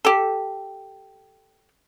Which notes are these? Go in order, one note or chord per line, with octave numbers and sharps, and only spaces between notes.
G4 A4